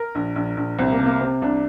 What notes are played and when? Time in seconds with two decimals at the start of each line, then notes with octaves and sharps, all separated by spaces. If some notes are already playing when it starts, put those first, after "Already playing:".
Already playing: A#4
0.15 A#1
0.36 A#1
0.57 A#1
0.79 C2 C4
0.92 A#3
0.99 C3
1.06 A#3
1.20 C3 C4
1.42 C2 D4